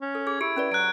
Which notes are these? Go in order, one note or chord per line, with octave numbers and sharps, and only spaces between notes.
C#4
A4
G#4 G#6
E4 G4 D7
C#4 B4 D5
F#3 F#6 D7